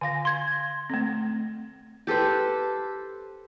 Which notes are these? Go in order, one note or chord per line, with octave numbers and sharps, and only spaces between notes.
D3 F5 G#5 A#6
C6 G#6
A3 C4
G4 A4 B4 C5